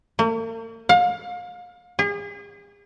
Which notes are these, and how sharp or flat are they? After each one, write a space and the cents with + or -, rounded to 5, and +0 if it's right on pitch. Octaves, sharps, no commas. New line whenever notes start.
A#3 -45
F5 +35
G#4 -40